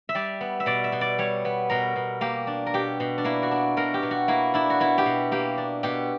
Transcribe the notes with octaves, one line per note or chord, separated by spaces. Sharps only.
E5
G3 D5
B3
E5
B2 D5
E5
B2
D5
G3 C#5
B3
B2 A#4
B2
A#3 G4
D4
A#4
B2 G4
B2
D4
A#3 E4
F#4
D4
B2 A#4
G4
B2
F#4
A#3 E4
D4 E4
F#4
B2 E4
G4
B2
A#3 G4
D4
B2 G4